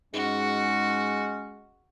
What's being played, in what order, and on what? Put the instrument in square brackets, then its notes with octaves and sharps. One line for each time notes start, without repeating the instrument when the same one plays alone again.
[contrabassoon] G#2 [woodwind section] G#3 C#4 [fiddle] F#4